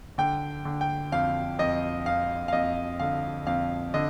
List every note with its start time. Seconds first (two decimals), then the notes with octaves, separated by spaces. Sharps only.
0.18 D3 G5
0.65 D3
0.81 G5
1.12 F2 F5
1.59 F2 D#5
2.06 F2 F5
2.48 F5
2.53 F2 D#5
2.99 D3 F5
3.47 F2 F5
3.94 D3 D#5